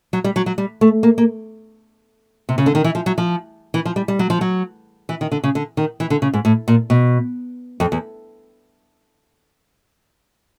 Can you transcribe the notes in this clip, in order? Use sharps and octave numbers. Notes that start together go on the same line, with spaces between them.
F#3
G3
F#3
F#3
G3
A3
A#3
A#3
C3
C#3
D3
D#3
E3
F3
F#3
F3
E3
F3
G3
G3
F#3
F3
F#3
E3
D#3
D3
C#3
D3
D#3
E3
D3
C#3
G#2
A2
A#2
B2
F2
E2